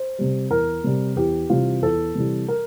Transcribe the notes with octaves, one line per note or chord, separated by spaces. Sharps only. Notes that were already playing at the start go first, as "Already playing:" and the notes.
Already playing: C5
C3 G3
E2 A#4
C3 G3
E2 G4
C3 E3 G3 F4
E2 A4
C3 E3 G3
A#4